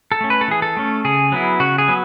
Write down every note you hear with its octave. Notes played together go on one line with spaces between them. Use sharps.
A4
A3 C#4
B4
A4
E3 G#4
A4
A3 C#4
C#3 G#4
F#3 B3 E4
C#3 F#4
G#4
F#3 B3